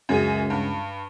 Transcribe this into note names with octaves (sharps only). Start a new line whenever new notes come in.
C#2 F#2 G#4
G2